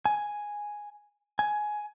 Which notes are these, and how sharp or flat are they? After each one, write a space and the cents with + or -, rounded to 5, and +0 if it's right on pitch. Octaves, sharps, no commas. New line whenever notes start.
G#5 +0
G#5 +15